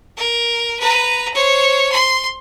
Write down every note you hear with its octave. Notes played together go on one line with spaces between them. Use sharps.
A#4
B4 A#5
C5 C#5
C6